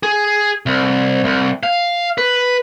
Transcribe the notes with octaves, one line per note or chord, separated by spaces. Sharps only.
G#4
C2
C2
F5
B4